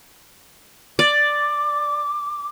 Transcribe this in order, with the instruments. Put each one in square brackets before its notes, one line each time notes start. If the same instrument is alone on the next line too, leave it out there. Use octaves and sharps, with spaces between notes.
[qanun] D5 [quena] D6